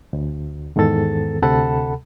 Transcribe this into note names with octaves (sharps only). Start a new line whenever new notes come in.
D2
E2 G#2 D#3 B3 A4 A6
D2 C3 A4 F#5 A5 B5